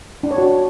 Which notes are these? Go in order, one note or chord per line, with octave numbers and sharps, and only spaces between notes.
D4
C#5
F#4